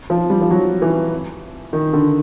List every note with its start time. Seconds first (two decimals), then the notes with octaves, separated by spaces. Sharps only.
0.10 F3
0.30 G3
0.41 F3
0.50 F#3
0.82 E3
1.73 D#3
1.93 D3